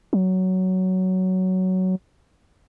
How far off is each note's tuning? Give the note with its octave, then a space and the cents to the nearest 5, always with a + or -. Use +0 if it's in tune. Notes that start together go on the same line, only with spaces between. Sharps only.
F#3 +10